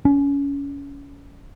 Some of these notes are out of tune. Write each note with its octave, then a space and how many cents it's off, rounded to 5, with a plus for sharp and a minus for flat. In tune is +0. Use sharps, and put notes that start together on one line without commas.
C#4 +25